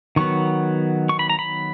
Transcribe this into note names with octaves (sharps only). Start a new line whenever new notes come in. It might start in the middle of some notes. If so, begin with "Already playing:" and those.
D#3 F#3 B3 C#6
C#6
B5
A#5
B5